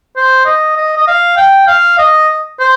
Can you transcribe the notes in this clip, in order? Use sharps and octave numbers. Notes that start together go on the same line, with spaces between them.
C5
D#5
D#5
D#5
F5
G5
F5
D#5
C5